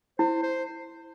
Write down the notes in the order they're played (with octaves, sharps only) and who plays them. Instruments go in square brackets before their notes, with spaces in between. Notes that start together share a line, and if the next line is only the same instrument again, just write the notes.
[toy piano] E4 [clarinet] C5
[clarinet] C5